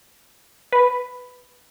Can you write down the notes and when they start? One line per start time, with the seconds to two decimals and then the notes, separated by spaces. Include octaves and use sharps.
0.72 B4